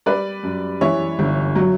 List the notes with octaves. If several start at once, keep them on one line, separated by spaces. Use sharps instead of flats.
G3 B4 D5
F#2
E3 C#5 E5
G1
F#3